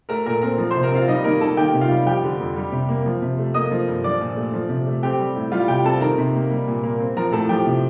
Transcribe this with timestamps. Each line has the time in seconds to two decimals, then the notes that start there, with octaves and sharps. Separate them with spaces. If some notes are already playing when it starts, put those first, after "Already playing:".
0.09 A3 A#4 A#5
0.26 A#2 A#4 A#5
0.42 C4 A#4 A#5
0.58 F3
0.71 C5 C6
0.75 C3
0.83 A#4 A#5
0.92 C4 F4 F5
1.08 G3 D#4 D#5
1.24 D#3 A#3 A#4
1.41 A#3 A4 A5
1.57 D#3 G4 G5
1.74 C3
1.81 F4 F5
1.91 G3
2.07 F3 G4 G5
2.24 D3
2.40 F2
2.56 G3
2.72 C3
2.89 A#3
3.06 F3
3.22 C3
3.38 A3
3.54 A#3 D#5 D#6
3.71 F3
3.88 G2
4.04 F3 D5 D6
4.21 A#2
4.36 A3
4.54 F3
4.69 C3
4.87 A3
5.03 C4 G4 G5
5.19 G3
5.36 A2
5.52 G3 F4 F5
5.68 C3 G4 G5
5.84 C4 A4 A5
6.01 D#3 A#4 A#5
6.18 C3
6.35 A#3
6.51 G3
6.68 A#2
6.84 A#3
7.00 C4
7.17 F3 A#4 A#5
7.32 A2 A4 A5
7.49 F3 G4 G5
7.66 C3